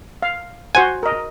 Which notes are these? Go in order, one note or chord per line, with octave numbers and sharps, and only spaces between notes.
F5
F#4 C5 F#5 G#5
A#4 D#5